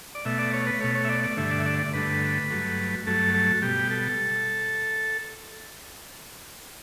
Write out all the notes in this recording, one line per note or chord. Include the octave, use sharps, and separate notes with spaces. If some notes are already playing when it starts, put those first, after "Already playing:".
D5
B2 A3 E5
D5
C#5
B4
B2 A3 C#5
C#5
E5
D5
D5
G2 D3 A3 E5
D5
E5
D5
D5
G2 D3 A3 B4
G2 F#3 A3
G2 F#3 A3 A4
A4
B2 G3 G4
A4